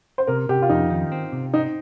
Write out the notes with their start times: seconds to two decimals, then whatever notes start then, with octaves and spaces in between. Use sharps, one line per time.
0.18 C5
0.27 C3 A#4
0.49 C3 G4
0.62 F4
0.69 F2 D#4
0.90 D#3
1.12 C4
1.32 C3
1.53 C4 D#4